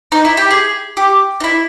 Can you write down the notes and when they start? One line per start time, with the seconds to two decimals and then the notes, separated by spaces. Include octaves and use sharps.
0.12 D#4
0.25 E4
0.37 G4
0.51 G#4
0.97 G4
1.40 D#4
1.44 E4